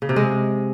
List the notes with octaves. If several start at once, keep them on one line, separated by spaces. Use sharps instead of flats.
C#3
C3
G#3